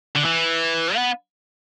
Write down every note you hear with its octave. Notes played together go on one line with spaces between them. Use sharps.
D3
E3
B3